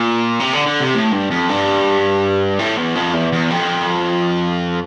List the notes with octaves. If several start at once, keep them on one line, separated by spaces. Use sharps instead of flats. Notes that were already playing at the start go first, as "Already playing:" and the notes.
Already playing: A#2
C3
D3
D3
C3
A2
G2
F2
G2
A2
E2
F2
E2
E2
F2